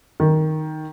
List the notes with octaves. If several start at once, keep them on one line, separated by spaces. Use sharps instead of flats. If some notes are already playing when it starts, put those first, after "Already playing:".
D#3